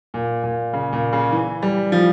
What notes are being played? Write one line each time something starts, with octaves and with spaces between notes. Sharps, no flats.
A#2
A#2
C#3
A#2
C#3
E3
G3
F3